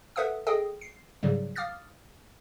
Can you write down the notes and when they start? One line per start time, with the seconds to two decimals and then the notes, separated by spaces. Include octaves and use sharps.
0.16 A4 B4 E5 F#5 D#6
0.47 G#4 A4 D#5 G5 D#6
0.81 C7
1.23 G#2 C#3 F#3 G3
1.56 F5 D6 D#6 F6 A6